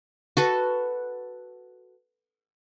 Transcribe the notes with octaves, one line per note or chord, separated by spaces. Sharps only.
F#4 A4 B4